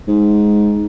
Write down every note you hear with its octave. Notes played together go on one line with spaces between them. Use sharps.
G#2